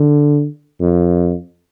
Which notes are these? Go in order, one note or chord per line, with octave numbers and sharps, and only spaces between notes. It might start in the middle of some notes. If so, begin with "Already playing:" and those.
Already playing: D3
F2